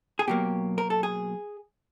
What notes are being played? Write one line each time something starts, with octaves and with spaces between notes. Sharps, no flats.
G#4
B2 F#3 A#3 G4
A#4
A4
G#4